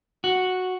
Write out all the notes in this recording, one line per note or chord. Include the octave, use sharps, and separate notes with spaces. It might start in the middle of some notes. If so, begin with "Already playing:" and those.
F#4